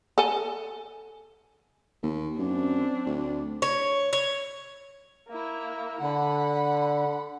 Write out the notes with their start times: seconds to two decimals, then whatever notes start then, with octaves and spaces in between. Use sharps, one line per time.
0.18 A4 G#5
2.03 D#2
2.39 F#2 C4 D4
3.06 D2
3.62 C#5
4.13 C#5
5.28 A#3 E4
6.00 D3 F#5 B5